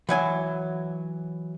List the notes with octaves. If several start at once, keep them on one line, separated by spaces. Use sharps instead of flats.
E3 F#3 G#5